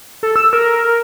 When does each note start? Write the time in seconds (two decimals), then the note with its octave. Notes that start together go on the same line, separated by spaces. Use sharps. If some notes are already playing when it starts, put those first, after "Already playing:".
0.23 A4
0.36 E6
0.53 A#4